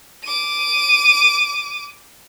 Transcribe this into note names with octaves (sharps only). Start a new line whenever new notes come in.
D6 D#7